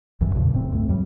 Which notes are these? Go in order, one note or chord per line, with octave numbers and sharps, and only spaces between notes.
B1 F#2 D#3 E3
E2 A#2 C#3 F3
F1 A2 C4
C#2 G2 A3
F2 F#3 G3